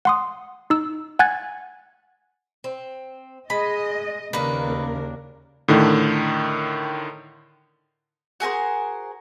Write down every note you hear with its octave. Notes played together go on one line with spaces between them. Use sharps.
F#5 C6 D#6
D#4 E6
F#5 G#5 F#6 G#6 A6
C4
G#3 D#5 B5
D#2 C#3 A#3 D4 D#4 A#4 B4
A2 D3 D#3
F#4 G#4 A#4 C5